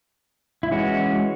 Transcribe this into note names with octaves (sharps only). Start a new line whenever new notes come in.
E4
E3 G#3 C#4 F#4